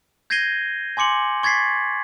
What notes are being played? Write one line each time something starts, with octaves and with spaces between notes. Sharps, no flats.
G6 G#6 A#6 C7 D#7 G7
G#5 C6 D6 C#7 F#7
C#6 G#6 A6 B6 C7